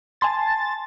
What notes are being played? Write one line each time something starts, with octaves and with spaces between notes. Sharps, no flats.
G#5 A5 C6 A6